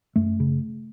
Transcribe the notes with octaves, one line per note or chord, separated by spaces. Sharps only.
F#2 A3
C#3